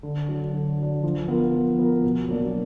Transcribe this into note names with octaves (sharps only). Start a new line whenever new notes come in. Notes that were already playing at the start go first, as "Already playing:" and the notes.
D3
F#3 D4
D3
F#3 D4
F3
B3 F4 A#4
F3
B3 F4 A#4
B2
F#3 A#3 D4